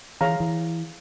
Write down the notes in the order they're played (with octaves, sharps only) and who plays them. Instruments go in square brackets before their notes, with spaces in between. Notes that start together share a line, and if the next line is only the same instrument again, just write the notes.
[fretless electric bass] E3 [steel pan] G#4 C#5 F5 A#5
[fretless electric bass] E3